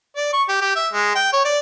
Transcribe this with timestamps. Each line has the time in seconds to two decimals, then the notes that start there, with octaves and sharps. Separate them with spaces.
0.16 D5
0.33 C#6
0.49 G4
0.61 G4
0.75 E5
0.93 G#3
1.15 G5
1.33 C#5
1.45 D5